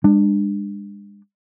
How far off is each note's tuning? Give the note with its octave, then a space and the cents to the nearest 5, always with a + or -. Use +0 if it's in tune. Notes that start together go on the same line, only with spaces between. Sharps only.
G#3 -40 D4 +20